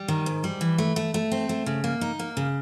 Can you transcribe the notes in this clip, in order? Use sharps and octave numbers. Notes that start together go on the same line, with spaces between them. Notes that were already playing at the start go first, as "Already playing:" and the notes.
Already playing: G3
D#3
G#2
G3
E3
A3
A3
A3
C4
A3
C#3
A#3
D#4
A#3
C#3